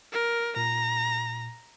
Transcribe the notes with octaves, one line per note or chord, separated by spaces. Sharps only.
A#4
A#2 A#5